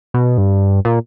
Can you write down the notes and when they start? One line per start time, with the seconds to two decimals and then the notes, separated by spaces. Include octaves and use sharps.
0.14 B2
0.38 G2
0.85 A#2